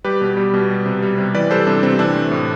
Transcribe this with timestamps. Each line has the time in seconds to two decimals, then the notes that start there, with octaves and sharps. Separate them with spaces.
0.05 G3 G4 B4
0.21 B2
0.37 G3
0.54 B2
0.70 G3
0.86 C3
1.02 G3
1.18 C3
1.34 E3 B4 D5
1.51 G3 A4 C5
1.67 C3 D4
1.83 C3 C4
1.99 E3 D4
2.16 A3
2.32 A2